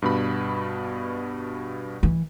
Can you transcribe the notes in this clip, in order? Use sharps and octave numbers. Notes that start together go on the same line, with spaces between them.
G2 B2 B5
E3